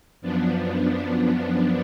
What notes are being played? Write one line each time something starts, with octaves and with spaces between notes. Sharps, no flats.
F#2 F3 B3 D4